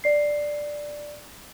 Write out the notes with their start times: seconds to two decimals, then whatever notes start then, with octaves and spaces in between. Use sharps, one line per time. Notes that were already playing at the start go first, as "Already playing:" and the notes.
0.04 D5 C7